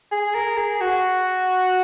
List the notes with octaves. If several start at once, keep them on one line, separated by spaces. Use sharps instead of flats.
G#4
A#4
G#4
F#4